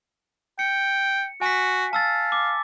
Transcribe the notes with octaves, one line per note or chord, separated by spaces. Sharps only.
G5 C#7
F#4 G#5 B6
F5 A5 E6 A6
D6